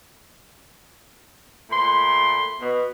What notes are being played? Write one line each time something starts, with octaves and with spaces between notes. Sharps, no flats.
A#2 A3 B5 C6
B2